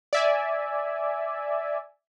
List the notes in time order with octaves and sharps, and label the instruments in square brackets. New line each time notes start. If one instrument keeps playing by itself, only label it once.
[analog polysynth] D5 E5 G#5